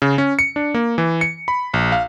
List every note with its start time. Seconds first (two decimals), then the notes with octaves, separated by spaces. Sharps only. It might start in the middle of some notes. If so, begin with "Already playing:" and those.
0.02 C#3
0.18 C#4
0.39 C#7
0.56 D4
0.74 A#3
0.98 E3
1.21 C#7
1.48 B5
1.74 A#1
1.92 F5